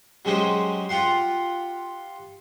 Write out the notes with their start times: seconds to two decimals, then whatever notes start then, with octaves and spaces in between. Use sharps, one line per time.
0.25 F#3 G#3 C#4 G4 C5 D#5
0.89 F4 G4 F#5 C6